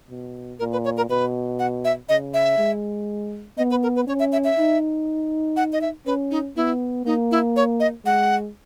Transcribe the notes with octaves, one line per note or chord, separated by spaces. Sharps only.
B2
A#2 A#4
B4
C#5
A#4
B2 B4
F#5
E5
C#3 D#5
E5
G#3
B3 D#5
B4
A#4
B4
C#4 C#5
E5
E5
E5
D#4
F#5
D#5
E5
C#4 B4
D#4
B3 E4
A#3 D#4
E4
C#5
D#5
G#3 F#5